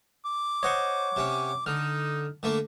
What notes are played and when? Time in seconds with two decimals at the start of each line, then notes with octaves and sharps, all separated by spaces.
0.25 D6
0.63 C5 C#5 D#5 F#5 C#6
1.16 C3 C#4
1.66 D3 D#4 F6
2.43 D3 A3 A#3